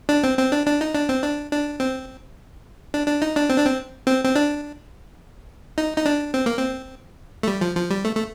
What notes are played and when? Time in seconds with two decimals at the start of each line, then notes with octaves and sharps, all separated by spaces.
0.09 D4
0.24 C4
0.38 C4
0.52 D4
0.67 D4
0.81 D#4
0.95 D4
1.09 C4
1.23 D4
1.51 D4
1.80 C4
2.94 D4
3.07 D4
3.22 D#4
3.36 D4
3.50 C4
3.58 D4
3.66 C4
4.07 C4
4.25 C4
4.36 D4
5.78 D#4
5.97 D#4
6.06 D4
6.34 C4
6.46 A#3
6.57 C4
7.43 A3
7.48 G3
7.61 F3
7.76 F3
7.90 G3
8.05 A3
8.16 A3